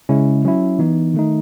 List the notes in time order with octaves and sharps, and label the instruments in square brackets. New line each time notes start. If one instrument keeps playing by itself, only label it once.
[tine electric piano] C#3 G#3 C#4 E4
F#3 C#4 E4
E3 B3 D#4
D#3 A3 D#4